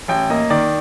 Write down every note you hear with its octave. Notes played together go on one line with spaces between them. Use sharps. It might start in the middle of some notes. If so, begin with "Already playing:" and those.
A1 G5
A#3 D#5
D#3 D5